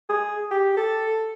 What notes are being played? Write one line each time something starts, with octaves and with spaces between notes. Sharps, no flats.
G#4
G4
A4